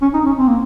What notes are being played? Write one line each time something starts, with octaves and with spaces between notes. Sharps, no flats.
C#4
D#4
C#4
C4
A#3